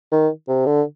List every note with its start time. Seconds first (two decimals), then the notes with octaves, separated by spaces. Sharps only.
0.12 D#3
0.48 C3
0.66 D3